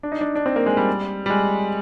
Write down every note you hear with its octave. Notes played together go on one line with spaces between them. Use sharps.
D4
D#4
D4
D4
C4
A#3
G#3
G3
G3
G#3